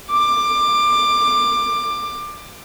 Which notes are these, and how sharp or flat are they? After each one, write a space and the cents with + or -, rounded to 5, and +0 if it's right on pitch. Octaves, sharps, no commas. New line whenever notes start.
D6 +20